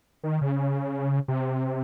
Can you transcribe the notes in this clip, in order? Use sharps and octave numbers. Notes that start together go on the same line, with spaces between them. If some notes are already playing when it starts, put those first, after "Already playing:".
D#3
C#3
C3